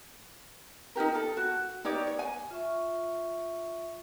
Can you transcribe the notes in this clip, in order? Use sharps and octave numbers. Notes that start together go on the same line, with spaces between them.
D#4 F4 G4 A#4
A4
F#4
D#4 G4 C#5 D5
C#5
G#5
F4 E5 C#6